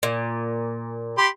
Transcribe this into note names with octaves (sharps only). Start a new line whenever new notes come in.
A#2
G4 B5 C6